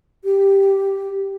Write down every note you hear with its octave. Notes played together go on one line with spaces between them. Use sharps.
G4